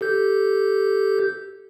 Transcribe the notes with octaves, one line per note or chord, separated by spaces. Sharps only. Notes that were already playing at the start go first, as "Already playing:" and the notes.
G4 A4 G6